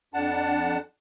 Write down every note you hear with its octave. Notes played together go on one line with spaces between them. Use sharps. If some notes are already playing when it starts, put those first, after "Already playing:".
F2 D4 F#5 A5